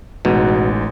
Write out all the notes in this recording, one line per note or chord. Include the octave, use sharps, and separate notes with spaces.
A1 B2 G#3 D#4